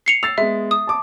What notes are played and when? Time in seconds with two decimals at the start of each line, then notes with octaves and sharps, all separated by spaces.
0.06 C7 C#7 F7
0.23 E6 A6 C7 F7
0.38 G#3 B3 E5
0.71 D#6
0.87 A5 D6